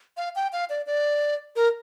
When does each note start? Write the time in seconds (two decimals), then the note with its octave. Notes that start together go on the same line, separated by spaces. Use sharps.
0.17 F5
0.36 G5
0.53 F5
0.70 D5
0.86 D5
1.56 A#4